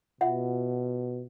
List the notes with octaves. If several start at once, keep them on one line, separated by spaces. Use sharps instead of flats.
B2 F4 E5 F#5